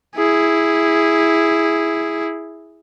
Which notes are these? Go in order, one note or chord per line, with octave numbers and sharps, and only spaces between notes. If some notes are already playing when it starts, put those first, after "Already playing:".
E4 G#4